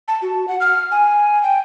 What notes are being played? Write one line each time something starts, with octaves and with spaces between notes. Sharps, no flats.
A5
F#4
F#5
F6
G#5
G5